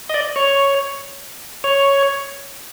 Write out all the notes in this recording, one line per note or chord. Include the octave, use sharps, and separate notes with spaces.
D#5
D5
C#5
C#5